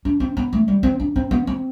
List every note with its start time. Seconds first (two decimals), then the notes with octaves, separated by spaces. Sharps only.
0.05 D4
0.20 C4
0.37 B3
0.53 A3
0.68 G3
0.83 C4
1.00 D4
1.16 C4
1.31 B3
1.47 C4